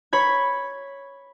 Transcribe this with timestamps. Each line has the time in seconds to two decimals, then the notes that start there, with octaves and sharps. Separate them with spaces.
0.13 C#5 B5 G#6